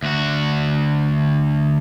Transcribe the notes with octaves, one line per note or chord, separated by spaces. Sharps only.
D2 F#4